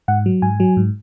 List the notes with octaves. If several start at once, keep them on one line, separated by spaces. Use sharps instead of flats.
G#2 F#5
F#3
G#2 G#5
F#3
G#2